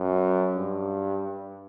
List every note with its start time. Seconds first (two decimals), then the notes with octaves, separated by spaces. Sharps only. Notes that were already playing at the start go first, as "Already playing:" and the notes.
Already playing: F#2
0.56 G2